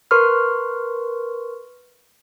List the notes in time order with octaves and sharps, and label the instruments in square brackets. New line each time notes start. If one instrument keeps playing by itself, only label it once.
[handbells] A#4 B4 C6 C#6 F6